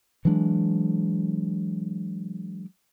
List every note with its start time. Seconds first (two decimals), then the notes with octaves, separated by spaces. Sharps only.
0.25 E3 F#3 G#3 D4